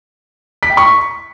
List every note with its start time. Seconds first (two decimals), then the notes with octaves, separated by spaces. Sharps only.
0.63 B6
0.70 G5
0.77 C#6